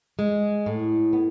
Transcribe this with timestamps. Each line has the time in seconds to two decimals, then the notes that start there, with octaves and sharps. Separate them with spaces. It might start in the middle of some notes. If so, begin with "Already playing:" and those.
0.19 G#3
0.66 A2
1.13 B3